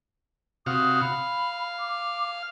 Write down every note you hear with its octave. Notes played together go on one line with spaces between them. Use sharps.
C3 F#4 F5 D#6
F5 B5
D6